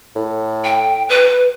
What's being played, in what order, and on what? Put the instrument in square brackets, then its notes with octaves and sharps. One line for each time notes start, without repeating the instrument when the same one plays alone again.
[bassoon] A2
[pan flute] G5
B4